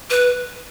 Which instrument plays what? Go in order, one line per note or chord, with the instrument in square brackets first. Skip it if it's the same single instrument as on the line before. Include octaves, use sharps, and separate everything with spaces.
[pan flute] B4